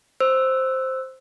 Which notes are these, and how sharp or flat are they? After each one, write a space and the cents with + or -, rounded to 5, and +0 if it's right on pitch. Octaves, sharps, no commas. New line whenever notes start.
C5 +0 E6 +0